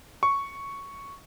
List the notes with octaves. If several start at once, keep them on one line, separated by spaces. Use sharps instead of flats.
C#6